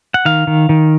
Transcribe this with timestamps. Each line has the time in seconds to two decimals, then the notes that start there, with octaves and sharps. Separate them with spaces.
0.14 F#5
0.25 D#3 F5
0.47 D#3
0.69 D#3